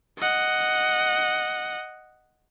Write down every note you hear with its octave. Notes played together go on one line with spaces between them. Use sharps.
D#5 F#5